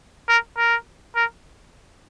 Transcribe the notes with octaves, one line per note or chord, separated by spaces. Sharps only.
A#4
A#4
A#4